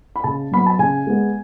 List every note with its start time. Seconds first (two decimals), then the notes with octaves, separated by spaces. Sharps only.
0.16 B5
0.24 C#3 A5
0.51 F#3 B3 B5
0.66 A5
0.79 C#3 G#5
1.07 G#3 B3